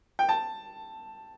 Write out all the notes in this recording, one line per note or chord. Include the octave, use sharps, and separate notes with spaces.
G5
A5